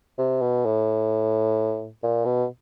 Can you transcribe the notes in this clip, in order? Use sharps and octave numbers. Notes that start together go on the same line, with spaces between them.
C3
B2
A2
A#2
B2